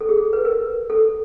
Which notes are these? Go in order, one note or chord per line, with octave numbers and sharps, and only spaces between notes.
A4
G#4
A4
B4
A#4
A4